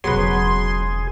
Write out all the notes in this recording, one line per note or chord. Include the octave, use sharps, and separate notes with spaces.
E1 C#3 F#3 B3 G#4 B4 C6